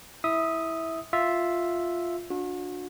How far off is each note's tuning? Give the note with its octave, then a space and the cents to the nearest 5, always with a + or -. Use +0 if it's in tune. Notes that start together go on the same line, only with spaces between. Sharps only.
E4 -10 E5 -15 D#6 +0
F4 +0 E5 +0
D4 +0 F#4 -40